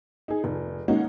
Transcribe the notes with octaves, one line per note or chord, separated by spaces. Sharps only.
D#4 G#4
F1
G#3 A#3 C#4 D#4 F#4